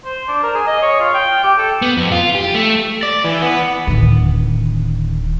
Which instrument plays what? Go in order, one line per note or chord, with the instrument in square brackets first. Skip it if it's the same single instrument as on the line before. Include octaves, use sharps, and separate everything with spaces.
[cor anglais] C5
D4
A#4
G#4
D#5
C#5
F4
G5
G4
A4
[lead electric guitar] B3
F2
F4
G4
A3
[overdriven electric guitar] D5
E3
B3
[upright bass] D1 D#3